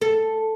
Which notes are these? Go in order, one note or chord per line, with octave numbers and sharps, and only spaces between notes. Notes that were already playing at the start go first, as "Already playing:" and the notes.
A4